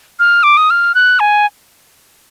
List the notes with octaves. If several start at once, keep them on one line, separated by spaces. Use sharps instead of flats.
F6
D6
D#6
F6
F#6
G#5